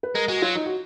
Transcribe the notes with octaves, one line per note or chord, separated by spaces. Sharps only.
B4
G#3 A#4
G#3 F#4
F#3 F4
D#4
F#4